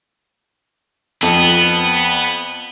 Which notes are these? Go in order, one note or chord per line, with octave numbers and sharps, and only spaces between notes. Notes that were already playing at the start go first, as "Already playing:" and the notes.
F2 B3